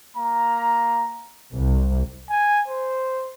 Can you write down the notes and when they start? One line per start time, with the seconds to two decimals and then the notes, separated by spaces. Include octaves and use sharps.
0.16 A#3 F5 A#5
1.52 C2
2.30 G#5
2.68 C5